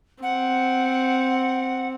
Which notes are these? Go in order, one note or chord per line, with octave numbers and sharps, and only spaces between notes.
C4 F#5